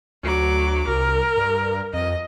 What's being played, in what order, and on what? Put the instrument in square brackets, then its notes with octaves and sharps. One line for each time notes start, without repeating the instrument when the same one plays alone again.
[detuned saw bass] D2 [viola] F#3 D6
[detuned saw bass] C2 [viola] A#4
[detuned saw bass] G2
[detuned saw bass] F2 [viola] D#5